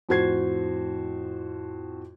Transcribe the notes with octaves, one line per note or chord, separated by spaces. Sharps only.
F2 A2 F#4 C5 G#6 C7